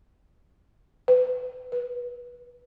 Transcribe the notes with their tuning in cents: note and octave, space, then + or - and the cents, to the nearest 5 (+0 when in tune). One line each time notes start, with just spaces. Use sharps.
B4 +25
B4 -20